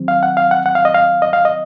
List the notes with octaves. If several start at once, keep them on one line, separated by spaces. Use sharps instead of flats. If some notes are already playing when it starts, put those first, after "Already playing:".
Already playing: D#3 F#3 C4
F5
F#5
F5
F#5
F#5
F5
D#5
F5
D#5
F5
D#5